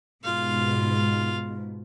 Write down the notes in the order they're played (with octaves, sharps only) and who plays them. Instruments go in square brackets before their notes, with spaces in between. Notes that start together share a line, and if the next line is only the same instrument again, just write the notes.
[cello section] G#2 B2 [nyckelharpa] F4 F5